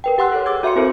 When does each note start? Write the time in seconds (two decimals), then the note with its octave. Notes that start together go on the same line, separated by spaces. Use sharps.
0.04 A#4 B4 G5
0.18 G4 F#5 C6 E6 F#6
0.32 A4 C#5
0.46 G#4 D6 E6 G#6
0.63 F#4 E5 F5 C6 C#7
0.76 C4 E4 F#4 A4 A#4 C5